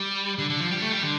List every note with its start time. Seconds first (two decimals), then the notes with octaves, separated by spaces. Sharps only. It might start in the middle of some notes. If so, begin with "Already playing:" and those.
Already playing: G3
0.39 D3
0.50 D3
0.60 F3
0.71 G3
0.82 A3
0.92 G3
1.03 D3